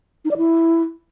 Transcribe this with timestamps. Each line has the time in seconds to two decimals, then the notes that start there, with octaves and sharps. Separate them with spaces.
0.25 D#4
0.31 D5
0.37 E4